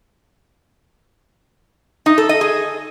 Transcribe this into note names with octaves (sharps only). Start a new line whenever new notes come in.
D#4
A4
D#5
G#4